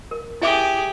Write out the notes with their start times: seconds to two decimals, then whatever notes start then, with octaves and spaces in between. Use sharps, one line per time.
0.11 A#4
0.42 E4 G4 G#4 E5 D6